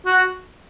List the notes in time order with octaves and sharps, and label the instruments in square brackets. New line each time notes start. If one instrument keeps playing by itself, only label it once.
[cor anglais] F#4